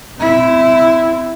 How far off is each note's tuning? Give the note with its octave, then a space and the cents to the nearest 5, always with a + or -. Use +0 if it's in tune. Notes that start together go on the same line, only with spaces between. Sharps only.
C4 -35 E4 +0